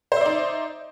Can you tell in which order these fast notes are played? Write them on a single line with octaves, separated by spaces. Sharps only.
C5 E5 D5 D#4